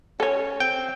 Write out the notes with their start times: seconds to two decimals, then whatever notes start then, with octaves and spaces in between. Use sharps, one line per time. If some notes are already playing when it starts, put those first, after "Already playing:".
0.20 C#4 A4 C#5
0.60 C4 G5